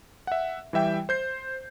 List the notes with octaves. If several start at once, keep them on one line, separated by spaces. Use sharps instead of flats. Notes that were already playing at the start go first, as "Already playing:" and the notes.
E5 F#5
E3 G3 E5 G5
C5 G6 C7